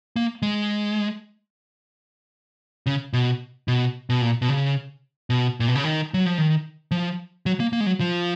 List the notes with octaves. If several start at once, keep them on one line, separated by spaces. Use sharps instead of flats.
A#3
G#3
C#3
B2
B2
B2
A#2
B2
C#3
B2
A#2
B2
C#3
D#3
F#3
F3
D#3
F3
F#3
A#3
A#3
G#3
F#3
F3